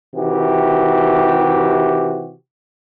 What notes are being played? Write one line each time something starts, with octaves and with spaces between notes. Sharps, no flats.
C3 D#3 E3 F#4 G4